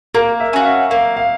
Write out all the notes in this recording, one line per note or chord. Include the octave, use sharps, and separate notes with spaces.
A#3 A#4
E5
C#4 F#4 F5
E5
A#3 F5
F5